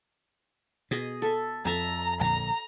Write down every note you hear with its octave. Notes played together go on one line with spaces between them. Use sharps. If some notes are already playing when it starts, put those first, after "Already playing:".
B2 G#4 D#5
A4 E5
F2 A4 E5 A5 A#5
A#1 D3 A#5